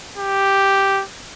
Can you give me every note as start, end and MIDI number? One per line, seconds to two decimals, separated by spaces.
0.18 1.03 67